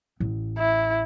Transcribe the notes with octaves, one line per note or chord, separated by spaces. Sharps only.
A1
E4